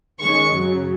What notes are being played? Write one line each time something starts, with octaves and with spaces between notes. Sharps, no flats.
D#3 G#3 C#4 C#6
F#2 C#3 F#3